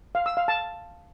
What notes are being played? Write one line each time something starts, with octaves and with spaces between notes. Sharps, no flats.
F5
E6
F5
A5